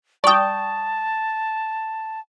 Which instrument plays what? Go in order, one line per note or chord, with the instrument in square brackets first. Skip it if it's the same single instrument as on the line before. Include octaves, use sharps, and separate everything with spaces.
[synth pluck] D5 G5 [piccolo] A5 [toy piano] C#6 D#6